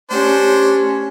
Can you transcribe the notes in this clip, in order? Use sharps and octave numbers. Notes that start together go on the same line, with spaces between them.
A3 C#4 D4 G4 C5